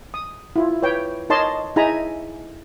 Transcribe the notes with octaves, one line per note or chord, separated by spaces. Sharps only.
D#6
E4 F4
B4 C#5 G5
D#4 A#4 C#5 D#5 A5 C6
D#4 E4 G#4 G#5 A#5 B5